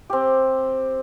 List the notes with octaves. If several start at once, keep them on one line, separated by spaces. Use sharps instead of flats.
C4 G4